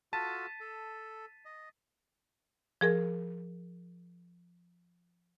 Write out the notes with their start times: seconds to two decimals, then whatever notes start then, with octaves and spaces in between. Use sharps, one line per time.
0.13 F4 F#4 A4 A5 A6 B6 D#7
0.61 A4
1.45 D#5
2.81 F3 G#4 A#4